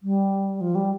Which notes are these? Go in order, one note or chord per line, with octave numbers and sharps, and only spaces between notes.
G3
F3
G3